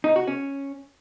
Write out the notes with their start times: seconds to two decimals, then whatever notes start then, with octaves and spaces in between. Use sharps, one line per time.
0.04 D#4
0.16 F#4
0.27 C#4